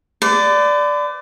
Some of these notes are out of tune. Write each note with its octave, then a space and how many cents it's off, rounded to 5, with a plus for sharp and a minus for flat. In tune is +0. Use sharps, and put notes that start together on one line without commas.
B4 +45 D5 +0